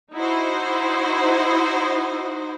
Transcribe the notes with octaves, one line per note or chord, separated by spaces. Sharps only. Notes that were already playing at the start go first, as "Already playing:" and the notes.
D#4 E4 F#4 C5